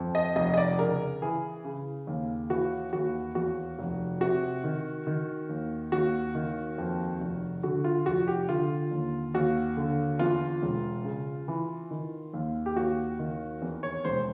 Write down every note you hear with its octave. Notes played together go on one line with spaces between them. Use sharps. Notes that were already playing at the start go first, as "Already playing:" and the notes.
Already playing: F2
D#5
F1 D#5
D#5
D5
C#3 A#4
E3 G#4
C#3
D#2
E3 F#4
D#2 F#4
E2 F#4
F1
C3 F#4
D#3
D#3
D#2
D#2 F#4
D#3
F2
F1
D3 F#4
F4
F1 F#4
G4
D3 F4
D#2
D#2 F#4
D3
E2 F4
E1
C#3
E3
D#3
D#2
G4
D#2 F#4
D#3
E2
C#5
E1 C5